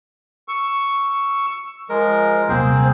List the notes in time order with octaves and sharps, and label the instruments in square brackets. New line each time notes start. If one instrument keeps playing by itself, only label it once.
[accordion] C#6 E6
[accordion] F3 [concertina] G#3 A#4
[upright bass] D#1 C3 [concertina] A#3 C4 G#4 [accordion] C5